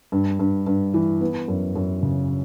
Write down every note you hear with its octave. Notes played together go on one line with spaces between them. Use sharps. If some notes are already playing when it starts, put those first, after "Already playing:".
G2
G2
G2
E3
B3
F#2
F#2
C#3